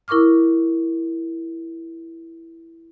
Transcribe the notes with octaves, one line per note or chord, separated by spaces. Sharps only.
E4 A#4 C#6 D6 F6